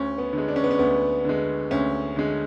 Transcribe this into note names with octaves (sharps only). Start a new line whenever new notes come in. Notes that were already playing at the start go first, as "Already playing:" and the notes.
Already playing: D2 C#4
B3
D3 G#3
D4
C#4
B3
C#4
D2 B3
D3 G#3
D2 C#4
D3 G#3